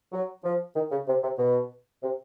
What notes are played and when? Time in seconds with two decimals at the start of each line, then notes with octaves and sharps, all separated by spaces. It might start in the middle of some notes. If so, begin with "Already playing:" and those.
0.12 F#3
0.43 F3
0.75 D#3
0.91 C#3
1.08 C3
1.23 C3
1.38 B2
2.03 C3